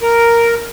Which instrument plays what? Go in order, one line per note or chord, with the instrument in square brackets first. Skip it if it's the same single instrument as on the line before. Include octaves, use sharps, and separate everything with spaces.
[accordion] A#4